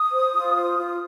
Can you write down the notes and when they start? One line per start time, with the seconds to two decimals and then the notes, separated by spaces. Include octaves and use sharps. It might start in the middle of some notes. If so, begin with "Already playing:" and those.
Already playing: D#6
0.12 C5
0.35 F4
0.56 C5
0.79 F4